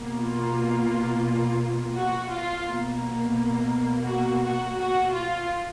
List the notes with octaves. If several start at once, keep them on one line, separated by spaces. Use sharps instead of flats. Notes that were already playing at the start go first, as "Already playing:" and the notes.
Already playing: B2 A#3
F4
F#4
F4
B2 A#3
F#4
F#4
F#4
F4